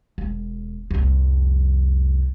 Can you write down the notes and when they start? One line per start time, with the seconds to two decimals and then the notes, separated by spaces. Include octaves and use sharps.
0.18 E1
0.91 C2 F2